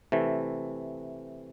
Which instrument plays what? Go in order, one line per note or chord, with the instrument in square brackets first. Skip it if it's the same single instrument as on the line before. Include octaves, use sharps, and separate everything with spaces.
[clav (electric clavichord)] C3 E3 A3